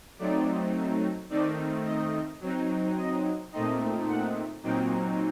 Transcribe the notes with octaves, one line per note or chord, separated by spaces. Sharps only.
F#3 A3 C4 D#4 D5
D#3 A3 C4 D#4 D5
D#5
F#3 C4 D#4
D#5
A#2 A3 C4 D#4 D#5
F#5
A#2 F#3 C4 D#4 G5